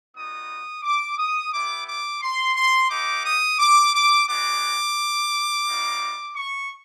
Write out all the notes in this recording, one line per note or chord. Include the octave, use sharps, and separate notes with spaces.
G3 B3 D#4 F#4 D#6
D6
D#6
B3 E4 G4 D6
D6
C6
C6
A#3 D#4 G4 D6
D#6
D6
D6
G#3 B3 D4 F#4 D6
G3 A#3 D#4 F#4
C#6